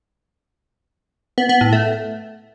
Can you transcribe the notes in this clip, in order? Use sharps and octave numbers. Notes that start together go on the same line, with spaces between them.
B3
B3
A2
A3